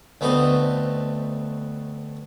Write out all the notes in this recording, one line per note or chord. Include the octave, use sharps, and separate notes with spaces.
D2 A3 B3 C4 D#5